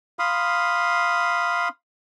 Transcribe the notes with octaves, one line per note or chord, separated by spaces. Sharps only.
F5 B5 C6 D#6